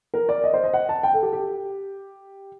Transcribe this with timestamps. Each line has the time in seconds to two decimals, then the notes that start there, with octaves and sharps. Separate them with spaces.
0.14 A#4
0.29 D5
0.44 D#5
0.53 C5
0.64 D#5
0.74 F#5
0.89 A5
1.03 G5
1.13 A4
1.23 G4
1.33 G4